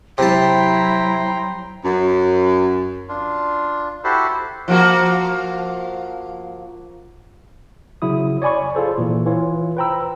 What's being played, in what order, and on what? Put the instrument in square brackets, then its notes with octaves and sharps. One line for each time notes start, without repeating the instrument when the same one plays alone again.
[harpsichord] C3 A5 [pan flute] F#3 [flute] E4 [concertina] G5 A#5 C6
[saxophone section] F#2
[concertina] D4 F4
E4 F#4 G4 A4 C5
[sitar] F3 A#3 F#4
[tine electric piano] C#3 F#3 E4 D#6
C#5 D5 G#5 B5 C#6
F4 G#4 A4 C5
A#2 E3
E3 F4 C#5
B4 C5 G5 A#5 B5 E6